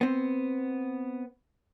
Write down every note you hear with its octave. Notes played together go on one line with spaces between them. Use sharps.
B3 C4